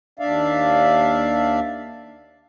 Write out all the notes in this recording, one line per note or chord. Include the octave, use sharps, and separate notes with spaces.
D#2 D4 D5 E5 F5